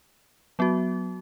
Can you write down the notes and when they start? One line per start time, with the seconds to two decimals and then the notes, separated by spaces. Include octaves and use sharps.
0.59 F#3 B3 F#4